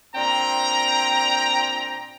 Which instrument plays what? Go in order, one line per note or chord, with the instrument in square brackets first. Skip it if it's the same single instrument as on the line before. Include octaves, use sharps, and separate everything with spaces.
[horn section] A#2 C4 D4 G5 A#5